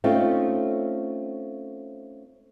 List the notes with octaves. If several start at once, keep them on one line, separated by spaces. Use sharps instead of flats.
A3 C4 C#4 D#4 F4